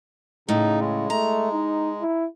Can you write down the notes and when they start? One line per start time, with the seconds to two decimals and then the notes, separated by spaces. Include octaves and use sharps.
0.49 A2 C#3 D#4
0.80 G#3
1.10 A3 A#5
1.52 D#4
2.01 E4